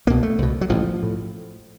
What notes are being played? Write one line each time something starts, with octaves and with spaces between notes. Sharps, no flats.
C2 B2 A#3
A3
C2 B2
F#3
A1 A2 F3
A2